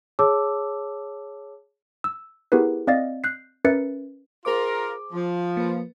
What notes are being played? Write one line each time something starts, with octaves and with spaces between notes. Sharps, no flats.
G#4 C#5 A5 D6 E6
E6
B3 E4 G4 G#4 A#4 B4
C4 D5 D#5 F5 A6
F#6 G6 C7
C#4 A#4 B4 E5 A6 C#7
F4 G#4 A#4 C5 D6
F3
A#3 B4